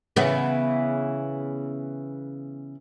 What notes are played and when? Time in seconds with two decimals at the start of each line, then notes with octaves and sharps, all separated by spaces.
0.16 C#3 E3 B3